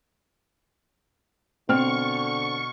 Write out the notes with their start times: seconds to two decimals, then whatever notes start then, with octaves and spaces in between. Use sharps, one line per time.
1.69 B2 D3 C4 C#6 F6